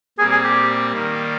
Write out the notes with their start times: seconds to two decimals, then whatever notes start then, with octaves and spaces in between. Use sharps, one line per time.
0.18 A#2 G3 C4 G#4
0.31 G#4
0.44 G4
0.93 D#3 G3 A#3